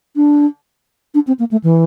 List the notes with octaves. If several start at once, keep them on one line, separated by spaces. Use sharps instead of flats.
D4
D4
C4
A#3
A3
E3